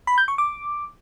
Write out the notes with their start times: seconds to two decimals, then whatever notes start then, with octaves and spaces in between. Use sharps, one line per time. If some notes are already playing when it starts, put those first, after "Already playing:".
0.07 B5
0.18 G6
0.28 C#6
0.38 D6